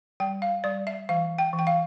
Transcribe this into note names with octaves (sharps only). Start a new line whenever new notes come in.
G3 G5
F5
G3 D5
E5
E3 F5
G5
E3
G5
F5